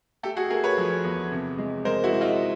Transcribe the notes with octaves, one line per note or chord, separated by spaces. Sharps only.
A3 G4 A4
F#4 G#4
A3 G#4 A#4
B4 C#5
F3
E2
C3
G#3
G#3 A#4 C5
E4 F#4
G#3
D#4 F4